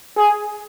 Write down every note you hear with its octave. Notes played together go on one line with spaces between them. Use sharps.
G#4